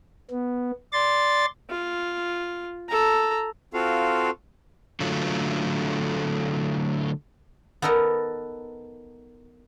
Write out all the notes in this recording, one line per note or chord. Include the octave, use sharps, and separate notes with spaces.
B3
D5 C6 A6
F4
A4 A#5
C4 F4 F#4 A4 F5
D3 F#3 A3 F4
B3 D#4 A4 A#4 D#5 F#5